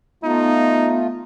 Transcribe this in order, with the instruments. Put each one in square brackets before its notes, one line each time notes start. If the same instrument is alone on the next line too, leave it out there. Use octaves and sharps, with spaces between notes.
[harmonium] A3 F4 [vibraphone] B3 [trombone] D#4